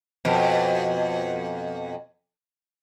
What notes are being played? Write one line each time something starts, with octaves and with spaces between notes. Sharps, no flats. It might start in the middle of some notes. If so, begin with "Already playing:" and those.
F2 B2